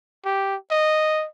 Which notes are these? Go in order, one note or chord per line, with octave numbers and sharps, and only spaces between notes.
G4
D#5